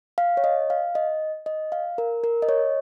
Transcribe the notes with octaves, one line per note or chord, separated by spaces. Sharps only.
F5
C#5
D#5
F5
D#5
D#5
F5
A#4
A#4
D#5
C#5